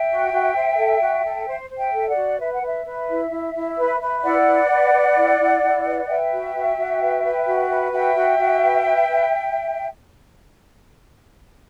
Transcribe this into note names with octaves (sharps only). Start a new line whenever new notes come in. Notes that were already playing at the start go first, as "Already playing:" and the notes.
Already playing: E5 G5
F#4
F#4
C5
A4
F#4
A4
C5
C5
E5 G5
A4 E5
D5 F#5
F#4
B4 E5
F#5
B4 E5
B4
E4
E4
E4
B4
B4
E4 D5 F#5
B4
B4
B4
E4
E4
E4
B4
B4 E5 G5
F#4
F#4
F#4
B4
B4
F#4
B4
F#4 E5 G5
F#4
F#4
B4
B4
B4